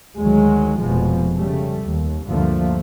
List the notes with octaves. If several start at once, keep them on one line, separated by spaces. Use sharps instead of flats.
D2 D#3 F#3 G#3
F1 B2 F3 G#3
C#3 G3 A3
D#2
D2 G2 D3 F3 A3 A#3